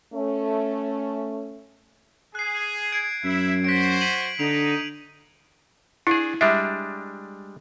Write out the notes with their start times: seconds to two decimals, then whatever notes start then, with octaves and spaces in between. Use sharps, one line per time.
0.13 A3 C#4
2.35 G#4 F#6 C7
2.92 G#6 D7
3.24 F#2 E4 E5
3.64 F#4 C5 B6 D7
4.01 B6 D#7 F#7
4.40 D3 D#4 D7 F7
6.07 D4 E4 G#4
6.41 G3 G#3 D4 E5